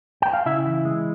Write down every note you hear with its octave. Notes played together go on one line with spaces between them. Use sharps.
G5
F5
C#3 E4 E5
E3
G#3